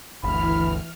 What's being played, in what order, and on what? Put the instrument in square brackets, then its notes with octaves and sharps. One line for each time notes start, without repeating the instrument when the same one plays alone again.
[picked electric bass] G1 D2 [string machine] E3 F6 [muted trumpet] B5